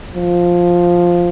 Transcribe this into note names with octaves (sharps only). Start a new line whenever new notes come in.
F3